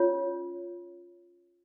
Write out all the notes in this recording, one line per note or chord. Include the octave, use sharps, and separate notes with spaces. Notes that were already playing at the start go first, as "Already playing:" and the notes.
Already playing: C#4 F4 C#5